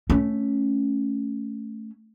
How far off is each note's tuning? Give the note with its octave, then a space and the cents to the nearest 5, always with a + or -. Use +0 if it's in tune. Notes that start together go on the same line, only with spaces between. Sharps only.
A3 +0 C#4 +0